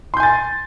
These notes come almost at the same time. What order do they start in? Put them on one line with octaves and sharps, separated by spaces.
C6 G6 G#5 A6